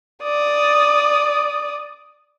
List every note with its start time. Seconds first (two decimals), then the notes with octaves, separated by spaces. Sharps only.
0.23 D5 D#6